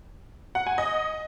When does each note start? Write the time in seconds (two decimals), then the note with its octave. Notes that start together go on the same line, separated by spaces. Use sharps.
0.55 F#5
0.67 G#5
0.78 D#5